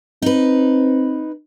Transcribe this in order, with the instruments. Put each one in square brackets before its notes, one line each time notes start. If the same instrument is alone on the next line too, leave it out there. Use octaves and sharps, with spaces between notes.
[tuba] C4 [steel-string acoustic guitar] D#4 B4